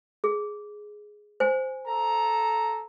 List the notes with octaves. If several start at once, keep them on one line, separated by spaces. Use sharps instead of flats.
G#4
C5 G#5
A4 A#5